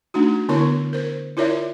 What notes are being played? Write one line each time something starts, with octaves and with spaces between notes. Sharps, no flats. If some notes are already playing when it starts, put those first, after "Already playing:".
A3 D4 D#4 F#4
D3 B3 E4 A#4 C#5 C#6
A#4 C5
E4 F4 A#4 C#5 D5 E5